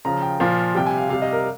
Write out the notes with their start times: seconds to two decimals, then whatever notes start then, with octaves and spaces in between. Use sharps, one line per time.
0.05 C#3 F3 A#5
0.22 G5
0.40 A#2 F3 F5
0.75 C3 G3 G5
0.86 G#5
0.98 F5
1.09 C3 G3 F5
1.22 D#5
1.33 A#4